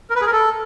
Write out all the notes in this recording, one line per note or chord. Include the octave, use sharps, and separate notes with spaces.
A#4
B4
G#4
A#4
A4